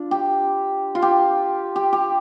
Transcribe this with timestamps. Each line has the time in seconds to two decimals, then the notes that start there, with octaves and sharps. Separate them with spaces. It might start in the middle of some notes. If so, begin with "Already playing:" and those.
Already playing: D4 F4
0.11 G4
0.95 F4
1.02 G4
1.76 G4
1.93 G4